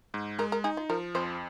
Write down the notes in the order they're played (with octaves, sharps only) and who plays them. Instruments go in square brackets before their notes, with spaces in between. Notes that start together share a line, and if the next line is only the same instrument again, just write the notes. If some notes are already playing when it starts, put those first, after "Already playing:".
[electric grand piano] G#2
[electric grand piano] G#3 [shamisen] A#4
[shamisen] A#4
[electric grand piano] D#4 [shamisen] G#4
[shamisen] F4
[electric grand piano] F3 [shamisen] A#4
[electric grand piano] F2 [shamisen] C5